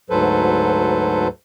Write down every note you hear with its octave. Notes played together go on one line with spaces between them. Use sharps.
D2 G#2 F#3 A4 B4 C5